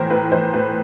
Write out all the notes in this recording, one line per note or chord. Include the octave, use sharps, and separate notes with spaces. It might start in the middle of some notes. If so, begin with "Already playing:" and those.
Already playing: A2 E3 A#4 C5
A2 B4
E3 C5
A2 B4